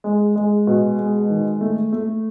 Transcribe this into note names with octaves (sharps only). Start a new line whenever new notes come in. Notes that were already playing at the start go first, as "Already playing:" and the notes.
G#3
G#3
B2
G#3
D#3
A3
A3